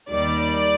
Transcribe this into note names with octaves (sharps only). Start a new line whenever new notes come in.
D#2 D#3 G3 D5